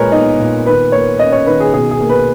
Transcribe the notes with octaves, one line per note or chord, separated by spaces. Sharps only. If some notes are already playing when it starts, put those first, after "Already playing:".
Already playing: A#2 G#3 A#4 B4 C#5
B3 D#4
A#2
D#3 B4
A#3 C#5
C#4 D#5
C#5
D#3 B4
G#4
B2 G#4
G#4
A#3
B4